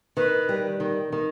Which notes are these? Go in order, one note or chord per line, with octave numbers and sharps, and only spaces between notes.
D#3 B4
G3
D#3
D#3